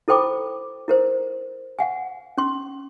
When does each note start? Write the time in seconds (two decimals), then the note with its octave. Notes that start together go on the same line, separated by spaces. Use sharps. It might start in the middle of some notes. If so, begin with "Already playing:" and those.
0.08 E4 A4 C5 G5 B5 D6
0.88 E4 A#4 C5
1.79 F5 F#5 G#5
2.38 C#4 C6